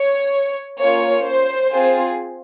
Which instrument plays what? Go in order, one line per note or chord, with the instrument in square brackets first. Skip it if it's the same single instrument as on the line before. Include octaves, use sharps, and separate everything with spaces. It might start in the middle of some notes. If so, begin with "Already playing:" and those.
Already playing: [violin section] C#5
A#3 C#4 F4 C#5
C5
C4 F4 G#4